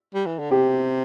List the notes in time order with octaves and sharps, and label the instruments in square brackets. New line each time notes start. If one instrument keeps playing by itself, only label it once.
[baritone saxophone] G3
E3
D3
[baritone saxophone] C3 [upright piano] G4